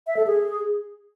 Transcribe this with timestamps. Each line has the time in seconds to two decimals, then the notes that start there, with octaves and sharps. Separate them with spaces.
0.07 E5
0.17 A4
0.27 G#4